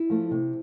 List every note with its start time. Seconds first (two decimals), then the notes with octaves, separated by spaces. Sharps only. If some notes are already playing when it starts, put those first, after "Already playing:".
Already playing: E4
0.10 F3 A3
0.31 C3